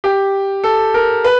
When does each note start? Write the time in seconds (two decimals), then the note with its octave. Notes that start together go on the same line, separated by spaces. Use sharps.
0.04 G4
0.64 A4
0.94 A#4
1.24 B4